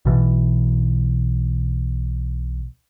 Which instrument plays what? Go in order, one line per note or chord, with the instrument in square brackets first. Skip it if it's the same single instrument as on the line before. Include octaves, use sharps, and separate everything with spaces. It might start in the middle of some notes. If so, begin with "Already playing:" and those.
[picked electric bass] B1 B2 E3